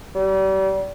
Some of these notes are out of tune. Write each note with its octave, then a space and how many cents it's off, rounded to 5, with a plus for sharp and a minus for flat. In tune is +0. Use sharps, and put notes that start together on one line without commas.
G3 -35